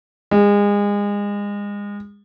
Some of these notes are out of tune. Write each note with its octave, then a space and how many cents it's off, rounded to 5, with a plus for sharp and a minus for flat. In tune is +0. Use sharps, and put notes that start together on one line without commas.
G#3 -30